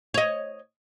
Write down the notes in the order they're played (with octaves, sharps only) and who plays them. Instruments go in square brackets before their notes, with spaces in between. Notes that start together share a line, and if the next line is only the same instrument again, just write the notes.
[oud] C#5 D#5